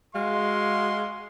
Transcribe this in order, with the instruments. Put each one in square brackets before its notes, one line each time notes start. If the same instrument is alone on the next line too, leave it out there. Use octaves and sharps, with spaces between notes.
[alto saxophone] G#3 [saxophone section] F#4 F5 [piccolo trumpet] C6